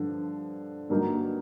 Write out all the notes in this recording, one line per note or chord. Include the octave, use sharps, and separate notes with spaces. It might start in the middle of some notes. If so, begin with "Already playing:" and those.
Already playing: G2 D3 F3
G2 D3 F#3 A#3 D#4